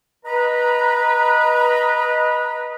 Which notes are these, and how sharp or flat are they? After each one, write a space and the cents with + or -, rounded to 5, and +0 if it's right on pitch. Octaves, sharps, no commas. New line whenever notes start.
B4 -20 D#5 +0 A#5 +0